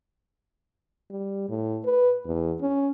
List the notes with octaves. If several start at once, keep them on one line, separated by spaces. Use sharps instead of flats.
G3
A2
B4
E2
C#4